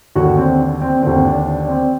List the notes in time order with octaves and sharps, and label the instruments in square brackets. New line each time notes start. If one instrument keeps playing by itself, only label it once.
[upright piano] D#2 D3 F#4
C4
D4
C4
D#2 D3 C4
D4
D4
C4